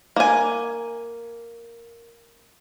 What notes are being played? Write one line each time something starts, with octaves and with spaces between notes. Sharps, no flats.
A#3 G#5